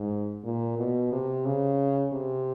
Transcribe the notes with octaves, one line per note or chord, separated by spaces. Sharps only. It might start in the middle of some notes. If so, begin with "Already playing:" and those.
Already playing: G#2
A#2
B2
C3
C#3
C3